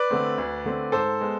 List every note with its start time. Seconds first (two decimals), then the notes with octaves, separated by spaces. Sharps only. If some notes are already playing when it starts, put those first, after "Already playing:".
Already playing: B4 D5
0.10 D3 A3 C4
0.38 D2
0.65 D3 A3 C4
0.92 G#2 A4 C5
1.20 G#3 B3